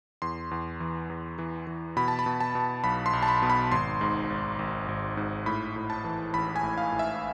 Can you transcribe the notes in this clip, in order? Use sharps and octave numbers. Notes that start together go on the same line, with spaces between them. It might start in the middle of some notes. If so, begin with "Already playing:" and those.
E2 C6
E2
E3
E2
E3
E3
B2 B5
A5
B5
B2
A5
B2
B1 B5
C6
B1
A5
B5
B2
B5
G#1 C6
G#2
G#1
G#1
G#1
G#2
A2 B5
A2
A5
E3
A1 B5
G#5
A2
F5
A2
E5